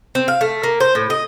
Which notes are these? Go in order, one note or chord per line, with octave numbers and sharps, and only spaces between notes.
C4
F5
A3
A#3
C5
A2
D#5